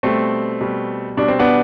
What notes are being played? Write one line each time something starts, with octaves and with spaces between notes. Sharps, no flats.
B2 G3 A3 C4
B2 G3
B2 G3 D4
C4
B3 D4